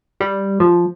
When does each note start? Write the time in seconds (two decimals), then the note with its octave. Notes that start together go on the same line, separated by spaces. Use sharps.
0.20 G3
0.60 F3